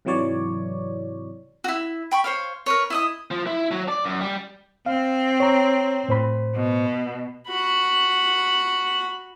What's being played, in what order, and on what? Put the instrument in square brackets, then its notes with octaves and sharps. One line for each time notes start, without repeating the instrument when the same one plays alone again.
[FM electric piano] G#2 C3 E3 F#3 C#5 D5
[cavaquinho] E4 F#4
G5 B5 C#6
C5 C#5 F5
A#4 B4 C#5
E4 D#5 D#6
[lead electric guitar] F3
E4
F#3
D5
F#2
G3
[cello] C4 [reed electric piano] F5
[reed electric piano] C#5 A#5
A2 C5 B5
[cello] B2
[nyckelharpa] F#4 B5